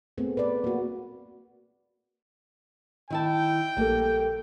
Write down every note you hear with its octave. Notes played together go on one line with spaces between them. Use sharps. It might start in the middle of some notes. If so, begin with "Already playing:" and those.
A3 B3 C4 G#4
B4 D5
A#3 F#4
D#3 E4 G5 A5
A#1 G3 A#3 A4